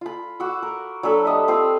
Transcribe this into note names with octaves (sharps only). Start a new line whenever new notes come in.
F4 B5
F#4 F#5 D6 E6
A#4
F#3 D4 A4 B5
G4 D#5 E5
C4 F4 C5